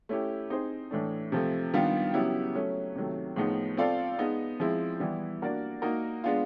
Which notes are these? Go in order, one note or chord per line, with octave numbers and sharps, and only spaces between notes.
A3 C#4 E4 G4
C4 D#4 G#4 C5
A2 E3 A3 D4
C3 F3 A3
D#3 G3 B3 D4 F4
C#3 F#3 B3 E4 G4
F#3 A3 C#4
C3 D#3 F#3 A3
A2 F3 G#3 B3 D#4
C4 F4 A4 D5 F5
G#3 B3 D#4
F3 G#3 C4 E4
E3 G3 B3 E4
A#3 D4 F#4 A#4 D5
A#3 D#4 F#4 A#4
G#3 B3 D4 F4